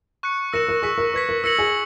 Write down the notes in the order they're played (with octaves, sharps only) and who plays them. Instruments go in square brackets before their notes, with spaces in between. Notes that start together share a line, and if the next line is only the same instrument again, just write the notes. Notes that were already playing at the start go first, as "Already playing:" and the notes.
[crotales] C#6 F#6 C#7
[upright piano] A#4 [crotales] E6 A#6 C#7 E7
[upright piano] A#4
[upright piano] G#4 [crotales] C#6 E6 B6
[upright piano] A#4
[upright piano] B4 [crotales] C#6 G#6 B6
[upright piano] A#4
[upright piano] A#4 [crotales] E6 A#6 C#7 F#7
[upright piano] G#4